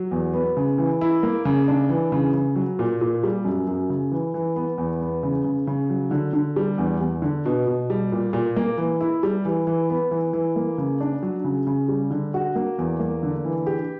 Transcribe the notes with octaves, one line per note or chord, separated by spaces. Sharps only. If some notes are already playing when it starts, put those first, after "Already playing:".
Already playing: F#3
E2
B3
C#3
E3
E4
A#3
C#3
D4
E3
C#3
C#3
F#3
A#2
A#2
G3
F#2
F#2
C#3
E3
E3
B3
E2
B3
C#3
C#3
C#3
F#3
D3
D3
G3
E2
E2
D3
B2
B2
G3
A#2
A#2
A#3
E3
E4
G3
E3
E3
B3
E3
E3
A#3
C#3
D4
F#3
C#3
C#3
G3
D3
F#4
A#3
E2
A#3
D3
E3
G4